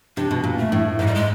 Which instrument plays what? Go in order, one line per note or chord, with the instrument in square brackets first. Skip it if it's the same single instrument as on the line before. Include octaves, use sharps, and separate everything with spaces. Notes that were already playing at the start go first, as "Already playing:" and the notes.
[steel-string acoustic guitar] C3 [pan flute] D4
[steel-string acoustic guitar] B2
A#2
[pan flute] A3
[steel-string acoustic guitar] A2
[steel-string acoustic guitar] G#2 [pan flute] G#3
[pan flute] G3
G#3